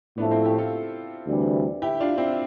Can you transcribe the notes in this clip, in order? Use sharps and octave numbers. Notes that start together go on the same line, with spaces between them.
A2 F3 A3 B3 D4
C4 E4
E4 G4
F4 A4
D2 C3 E3 G3 D4
E4 G4
D4 F4
C4 E4